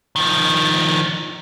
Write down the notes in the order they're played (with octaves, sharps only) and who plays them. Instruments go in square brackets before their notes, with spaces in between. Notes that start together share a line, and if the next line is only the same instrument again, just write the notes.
[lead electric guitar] D#3 F3